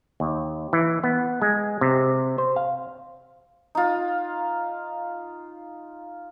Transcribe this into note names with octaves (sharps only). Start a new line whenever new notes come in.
D#2
E3
B3
G#3
C3
C5
F5
D#4 F4